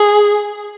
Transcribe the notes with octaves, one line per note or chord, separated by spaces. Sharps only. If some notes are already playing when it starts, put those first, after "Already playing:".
Already playing: G#4